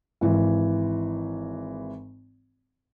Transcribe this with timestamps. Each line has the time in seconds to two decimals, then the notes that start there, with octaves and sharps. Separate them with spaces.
0.21 G#1 E3